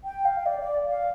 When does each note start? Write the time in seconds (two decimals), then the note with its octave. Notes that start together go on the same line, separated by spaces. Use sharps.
0.04 G5
0.25 F5
0.46 D5
0.60 D5
0.88 F5